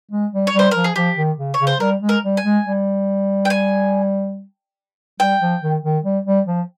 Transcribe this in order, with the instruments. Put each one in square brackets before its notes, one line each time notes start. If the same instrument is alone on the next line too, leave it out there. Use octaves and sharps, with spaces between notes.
[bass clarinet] G#3
G3
[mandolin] C#5
[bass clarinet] G3
[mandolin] C5
[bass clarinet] F3 [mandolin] A#4
[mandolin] G#4
[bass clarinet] F3 [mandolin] G4
[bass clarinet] D#3
C#3
[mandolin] C#5
[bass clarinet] C#3
[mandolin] C5
[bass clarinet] G3 [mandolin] A#4
[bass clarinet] G#3
[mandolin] A#4
[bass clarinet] G3
[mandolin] G#5
[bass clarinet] G#3
G3
[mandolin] G5
G#5
[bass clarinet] G3 [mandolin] G5
[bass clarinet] F3
D#3
D#3
G3
G3
F3